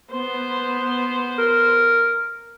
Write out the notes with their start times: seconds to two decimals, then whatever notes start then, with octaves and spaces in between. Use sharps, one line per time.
0.11 B3 C5
1.38 A#4